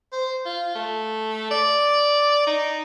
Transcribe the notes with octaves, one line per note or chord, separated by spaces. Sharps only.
C5
F4
A3
D5
D#4